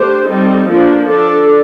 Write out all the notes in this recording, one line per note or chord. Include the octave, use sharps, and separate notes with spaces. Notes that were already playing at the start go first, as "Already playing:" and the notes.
Already playing: A3 D4 G4 C5
G3 C4 D#4 A4
F3 A#3 D4
D4 A4 D5